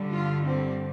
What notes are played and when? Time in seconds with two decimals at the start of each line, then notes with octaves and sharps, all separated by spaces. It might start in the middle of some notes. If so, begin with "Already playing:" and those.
Already playing: G2 D3 G3
0.12 F4
0.46 C4